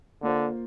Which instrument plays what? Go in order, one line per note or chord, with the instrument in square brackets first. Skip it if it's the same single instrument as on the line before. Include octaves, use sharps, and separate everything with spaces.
[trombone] D3 [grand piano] A#3 F4 C5